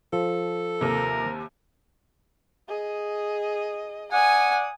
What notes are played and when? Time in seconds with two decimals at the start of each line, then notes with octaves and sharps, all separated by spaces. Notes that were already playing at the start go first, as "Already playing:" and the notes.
0.13 F3 A4
0.81 D#2 C3 A#4
2.68 G#4 D#5
4.12 D5 F#5 G#5 D#6